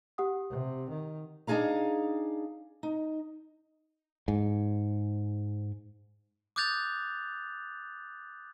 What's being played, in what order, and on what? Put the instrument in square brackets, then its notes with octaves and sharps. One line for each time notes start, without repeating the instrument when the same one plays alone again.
[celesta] G4 F#5 D#6
[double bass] C3
D#3
[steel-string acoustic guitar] D4 D#4 G#4 F5 A#5
D#4
[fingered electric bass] G#2
[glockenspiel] D6 D#6 F#6 G6 A6 F7